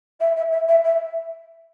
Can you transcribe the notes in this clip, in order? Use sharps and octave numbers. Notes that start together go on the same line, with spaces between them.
E5
E5
E5
E5
E5